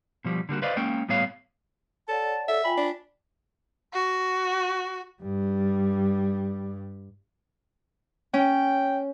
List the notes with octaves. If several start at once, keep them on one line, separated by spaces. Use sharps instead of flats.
B2 F3 G3
D3 G3 A#3 F#4
B4 C5 D5 D#5 F5
G#3 A#3 C#4 G5
A2 G3 B3 C#5 F5
A4 C#5 D5 F#5 A5
A4 E5
F4 G5 G#5 B5
D4
F#4
G2 G3
C#4 G5